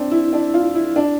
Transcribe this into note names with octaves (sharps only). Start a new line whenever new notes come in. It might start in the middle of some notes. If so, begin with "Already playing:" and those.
Already playing: C4 D4
E4
D4
F4
E4
D4